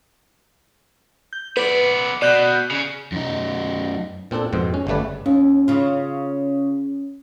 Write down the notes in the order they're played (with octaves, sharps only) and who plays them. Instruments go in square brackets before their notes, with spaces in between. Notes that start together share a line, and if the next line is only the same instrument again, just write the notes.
[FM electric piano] G6
[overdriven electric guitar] B3 D5 [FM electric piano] B4
[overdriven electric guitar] B2 [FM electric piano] D5 F#6 G6
[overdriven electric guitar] C#3 C#4
F#2 D#4
[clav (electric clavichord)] A#2 C4 D4 A4 A5
F2 G#2 B2 C4
C#4
G1 C#3 G3 A3 B4 D5
[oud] D#2 [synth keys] C#4
[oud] C#3 F4